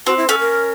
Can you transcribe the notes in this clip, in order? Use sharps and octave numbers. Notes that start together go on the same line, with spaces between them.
C4 F#4
E4
C#4 A4
A#4